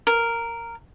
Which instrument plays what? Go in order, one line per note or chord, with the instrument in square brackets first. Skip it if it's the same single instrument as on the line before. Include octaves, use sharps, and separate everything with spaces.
[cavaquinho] A#4